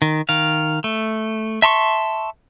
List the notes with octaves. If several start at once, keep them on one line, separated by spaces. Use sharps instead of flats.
D#3
D#3 F5
A3
E5 A5 C6 C#6